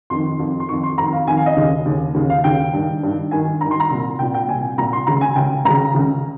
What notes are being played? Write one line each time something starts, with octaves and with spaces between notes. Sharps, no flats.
F2 D#3 C6
F2 D#3
C6
F2 D#3 C#6
C6
F2 D#3 A#5
F5
F2 D#3 G#5
F5
D#5
D#2 C#3
D#2 C#3
D#2 C#3
F5
D#2 C#3 G5
G2 D#3
G2 D#3
G2 D#3 G#5
G2 D#3 A#5
C6
A#5
C2 A#2
C2 A#2 G5
G5
C2 A#2 G#5
C2 A#2 A#5
C6
C#2 C#3 A#5
G#5
C#2 C#3 G5
C#2 C#3 A#5
C#2 C#3